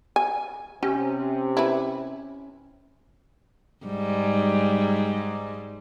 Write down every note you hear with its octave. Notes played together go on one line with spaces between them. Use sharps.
G#5
C3 C#4 G4
E4 B4
G#2 G3